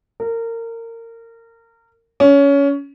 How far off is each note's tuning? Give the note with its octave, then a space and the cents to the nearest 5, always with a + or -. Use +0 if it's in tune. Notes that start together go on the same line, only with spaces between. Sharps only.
A#4 -25
C#4 +20